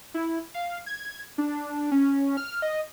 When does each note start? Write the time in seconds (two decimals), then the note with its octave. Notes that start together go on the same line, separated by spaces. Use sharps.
0.14 E4
0.54 F5
0.86 G#6
1.38 D4
1.91 C#4
2.37 F6
2.62 D#5